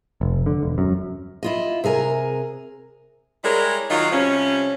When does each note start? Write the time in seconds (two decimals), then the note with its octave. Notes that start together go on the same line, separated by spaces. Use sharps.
0.21 F1
0.46 D3
0.63 E1
0.78 F#2
1.43 E4 F4 D#5
1.84 C3 G#4 A#4 G#5
3.44 G3 G#3 E4 G#4 A#4 C#5
3.90 D#3 F#3 D#4 F4
4.12 C3 F3 G3 C#4